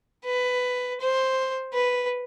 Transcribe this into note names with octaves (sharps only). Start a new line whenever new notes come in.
B4
C5
B4